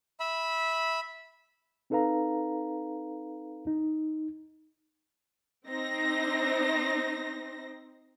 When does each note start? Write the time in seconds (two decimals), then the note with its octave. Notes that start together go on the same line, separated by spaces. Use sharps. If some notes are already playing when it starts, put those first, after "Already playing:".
0.20 E5 B5
1.90 C4 D#4 A4 B4 F5 A#5
3.67 D#4
5.67 C4 D#4 C5 A#6